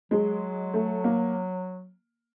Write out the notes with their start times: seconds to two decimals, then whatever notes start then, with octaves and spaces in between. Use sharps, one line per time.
0.11 F#3 G#3
0.74 A3
1.04 A#3